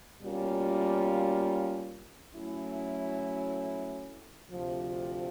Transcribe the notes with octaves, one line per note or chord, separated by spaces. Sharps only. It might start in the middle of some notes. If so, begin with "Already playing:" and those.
B2 G3 A#3 C#4 F4
F#3 A3 C#4 E4
D2 C3 F3